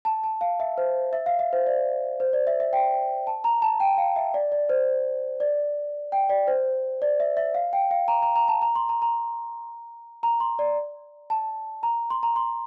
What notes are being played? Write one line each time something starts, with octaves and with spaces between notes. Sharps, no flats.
A5
A5
F5
E5
C5
E5
F5
E5
C5
D5
C5
D5
E5
E5
G5
A5
A#5
A5
G5
F5
E5
D5
D5
C5
D5
G5
D5
C5
D5
E5
E5
F5
G5
F5
A#5
A#5
A#5
A5
A#5
C6
A#5
A#5
A#5
C6
D5
A5
A#5
C6
A#5
C6